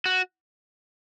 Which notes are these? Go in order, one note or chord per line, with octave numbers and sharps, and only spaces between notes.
F#4